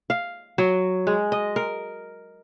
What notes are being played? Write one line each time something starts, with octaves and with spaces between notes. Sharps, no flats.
F5
F#3
G#3
D#5
A#4